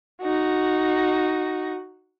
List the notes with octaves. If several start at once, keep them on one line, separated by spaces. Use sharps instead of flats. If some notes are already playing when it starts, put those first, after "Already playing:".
D#4 F#4